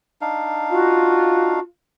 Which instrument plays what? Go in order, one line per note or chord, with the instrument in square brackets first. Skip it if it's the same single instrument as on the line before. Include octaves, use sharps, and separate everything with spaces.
[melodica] D4 D#4 F5
[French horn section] F4 [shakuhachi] F#4